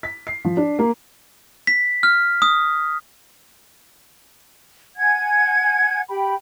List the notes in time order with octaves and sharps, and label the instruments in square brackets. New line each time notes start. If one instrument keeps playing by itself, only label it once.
[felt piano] B6
C7
F3
D4
A#3
[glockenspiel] B6
F6
D#6
[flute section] F#5 G#5 G#6
G4 G5 B5